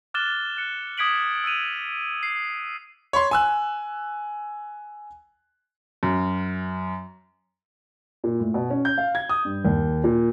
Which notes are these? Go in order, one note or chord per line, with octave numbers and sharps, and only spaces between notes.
D6 F6 F#6 A6 E7 G7
F#6 C#7
D6 D#6 G#6 B6 D7 F#7
E6 F#6 G#6 D#7 F7
C7
C#5 B5 C6
G#5 E6 F#6
F#2
A#2
A2
B2
C#4
G6
F5
G#6
D#6
G2
D#2
A#2